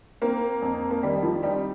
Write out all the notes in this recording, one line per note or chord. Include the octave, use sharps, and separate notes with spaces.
A#3 C4
F2
A#3
D#3 G3
F3
G3 D#4